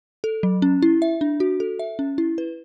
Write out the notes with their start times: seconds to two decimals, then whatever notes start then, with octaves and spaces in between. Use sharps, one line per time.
0.24 A4
0.43 F#3
0.62 C#4
0.82 E4
1.02 E5
1.21 D4
1.40 F#4
1.60 A4
1.79 E5
1.99 C#4
2.18 E4
2.38 B4